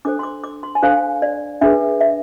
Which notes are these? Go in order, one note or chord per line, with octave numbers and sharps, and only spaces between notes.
D4 A4 C5 D6
C6
D6
D6
C6
G#5
D4 A4 C5 F5
D5
D4 G#4 B4 E5
E5